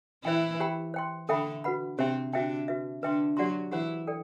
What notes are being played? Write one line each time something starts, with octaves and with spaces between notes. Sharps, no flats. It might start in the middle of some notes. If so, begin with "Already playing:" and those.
E3 E4 C5 E5 G5
G4 C5 G5 B5
C5 G5 C6
D3 D4 A4 E5 G5 B5
F#4 B4 F#5 B5
C3 C4 G4 C5 E5 G5
D3 D4 F#4 C5 E5 G5
F#4 B4 E5
D3 D4 B4 E5 G5 C6
F#3 F#4 G4 D5 F#5 C6
E3 E4 G4 C5 F#5
A4 D5 G5